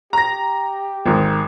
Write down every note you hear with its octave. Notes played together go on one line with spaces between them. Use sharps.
G4 A#5 A#6
G#1 G#2 A#4